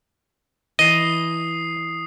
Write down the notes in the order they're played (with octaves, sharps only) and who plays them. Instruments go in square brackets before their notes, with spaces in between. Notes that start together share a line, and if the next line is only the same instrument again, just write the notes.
[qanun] E3 A5 [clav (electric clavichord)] D#5 [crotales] D#6 C7